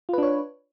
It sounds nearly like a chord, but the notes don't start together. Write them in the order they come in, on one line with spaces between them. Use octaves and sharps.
F4 B4 D4 C#5